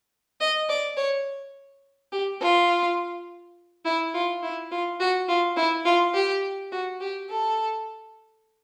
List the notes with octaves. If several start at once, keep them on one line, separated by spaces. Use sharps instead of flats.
D#5
D5
C#5
G4
F4
E4
F4
E4
F4
F#4
F4
E4
F4
G4
F#4
G4
A4